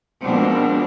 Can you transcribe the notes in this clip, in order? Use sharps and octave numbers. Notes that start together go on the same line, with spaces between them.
B2 D#3 F3 G#3 C4 D4